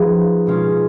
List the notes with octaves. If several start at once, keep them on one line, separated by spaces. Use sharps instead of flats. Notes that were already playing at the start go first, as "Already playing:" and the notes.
Already playing: F3 B3 D#4 G#4 B4
B2 G#3 C#4 F4